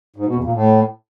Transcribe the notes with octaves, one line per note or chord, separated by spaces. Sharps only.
G#2
B2
E2
A#2
A2